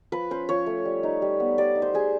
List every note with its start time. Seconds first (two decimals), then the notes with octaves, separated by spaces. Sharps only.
0.12 F3 B4
0.30 C#4 C5
0.49 F3 C#5
0.67 A3
0.85 G3
1.03 D#4
1.22 G3
1.40 B3
1.58 G3 D5
1.75 D#4
1.82 C5
1.94 G3 G#4